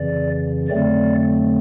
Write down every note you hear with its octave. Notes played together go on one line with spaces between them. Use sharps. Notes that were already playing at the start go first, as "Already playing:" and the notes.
Already playing: F2 C#3 E3 D5
F2 D3 F#3 A3 C4 D5